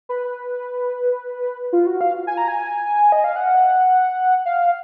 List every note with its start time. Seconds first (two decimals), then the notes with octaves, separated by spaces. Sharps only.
0.09 B4
1.73 F4
1.87 F#4
2.01 F5
2.27 G#5
2.37 A#5
2.48 G#5
3.12 D#5
3.24 F5
3.36 F#5
4.46 F5